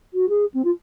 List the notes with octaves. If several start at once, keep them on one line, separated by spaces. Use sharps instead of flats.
F#4
G#4
C4
F4